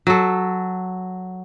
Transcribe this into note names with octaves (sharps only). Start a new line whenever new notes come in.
F#3 A4